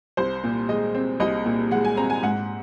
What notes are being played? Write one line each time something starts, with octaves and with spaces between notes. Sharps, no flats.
C2 C5
A#2
G#3 D#5
C4
C2 D#5
A#2
G#3 F#5
G#5
C4 A#5
G#5
G#2 F#5